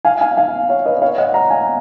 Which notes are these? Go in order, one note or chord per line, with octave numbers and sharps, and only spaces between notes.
F5 G#5
F5 G#5
F5 G#5
C#5 F5
B4 D#5
C#5 F5
D#5 F#5
F#5 A#5
F5 G#5